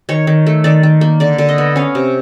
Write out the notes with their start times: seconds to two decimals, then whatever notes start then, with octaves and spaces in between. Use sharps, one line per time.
0.09 D#3 C#5
0.27 D#3
0.47 A3
0.64 D#3 D5
0.83 D#3
1.01 A#3
1.20 D3 D5
1.38 D3
1.49 D#5
1.58 B3
1.76 C#4 F5
1.95 C3